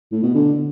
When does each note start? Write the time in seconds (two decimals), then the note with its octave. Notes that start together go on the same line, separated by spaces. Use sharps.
0.12 A2
0.23 B2
0.35 D3